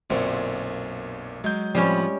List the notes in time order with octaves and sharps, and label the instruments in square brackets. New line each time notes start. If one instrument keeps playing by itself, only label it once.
[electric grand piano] B1 A#2 [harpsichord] F#2 D3 C4
[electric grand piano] F#3 G6 [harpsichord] G#3
[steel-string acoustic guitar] A2 F3 [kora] G3 C#4 [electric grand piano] C4 B5